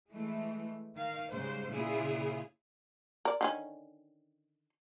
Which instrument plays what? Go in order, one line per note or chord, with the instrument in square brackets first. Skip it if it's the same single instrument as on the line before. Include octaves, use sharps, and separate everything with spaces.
[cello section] E3 G#3 A3
D#3 F5
G#2 C#3 G3 G#3 C5
A#2 C#3 E4 F4 G#4
[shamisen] A#4 D5
D3 D#3 C#4